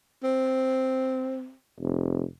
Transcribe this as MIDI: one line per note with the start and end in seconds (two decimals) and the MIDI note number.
0.24 1.54 60
1.80 2.23 29